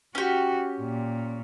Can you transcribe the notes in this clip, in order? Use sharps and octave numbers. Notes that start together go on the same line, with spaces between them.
C#4 F#4 G4
A#2